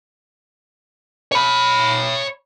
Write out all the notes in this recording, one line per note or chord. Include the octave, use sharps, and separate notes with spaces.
C#5 B5